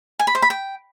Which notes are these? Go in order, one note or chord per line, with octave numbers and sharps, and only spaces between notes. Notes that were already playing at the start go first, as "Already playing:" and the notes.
G#5
B5
C5
B5
G5